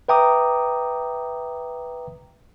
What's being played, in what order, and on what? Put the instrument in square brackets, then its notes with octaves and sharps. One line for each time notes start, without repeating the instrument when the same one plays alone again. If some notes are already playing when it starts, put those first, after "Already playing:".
[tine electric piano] B4 E5 G5 A#5 D6 D#6